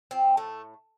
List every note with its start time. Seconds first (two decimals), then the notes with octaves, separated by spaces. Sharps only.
0.11 F3 C4
0.37 A2 A3